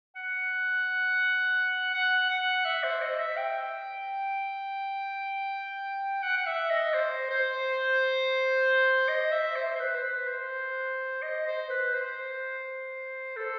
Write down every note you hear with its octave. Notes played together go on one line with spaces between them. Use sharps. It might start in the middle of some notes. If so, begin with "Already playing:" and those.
F#5
F#5
F#5
E5
C5
D#5
E5
G5
F#5
F#5
E5
D#5
C5
C5
D#5
E5
C5
C5
B4
C5
B4
C5
D#5
C5
B4
C5
A4